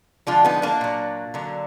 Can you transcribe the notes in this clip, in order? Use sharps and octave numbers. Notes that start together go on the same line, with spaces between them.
D3 F3 G#3 D4 F4
B3 D#4
A#3 D4
A#2 F#3
D3 F#3